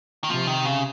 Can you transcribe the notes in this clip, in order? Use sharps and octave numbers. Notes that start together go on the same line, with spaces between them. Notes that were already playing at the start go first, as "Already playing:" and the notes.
D#3
C3 F3
D#3
C#3